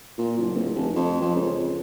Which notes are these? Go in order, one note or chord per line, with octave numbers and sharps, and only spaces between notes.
A#2
F#1
D1
F1
F2
F2
C#2